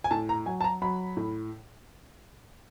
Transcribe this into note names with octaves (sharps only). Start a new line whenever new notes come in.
G#5
A2 A5
A#5
F#3 G#5
A5
A#5
F#3 B5
A2